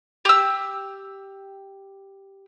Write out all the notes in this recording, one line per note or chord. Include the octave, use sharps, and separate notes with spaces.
G4 E6